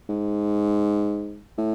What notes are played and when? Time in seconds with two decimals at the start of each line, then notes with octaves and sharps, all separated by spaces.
0.09 G#2
1.58 A2